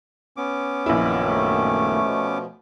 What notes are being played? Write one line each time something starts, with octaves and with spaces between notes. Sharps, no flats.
B3 C#4 D6
A#1 F#2 A#2 D#3 E4
A3
B2 F3